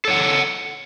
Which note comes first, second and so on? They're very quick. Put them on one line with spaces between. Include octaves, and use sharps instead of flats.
A4 C#5 F#5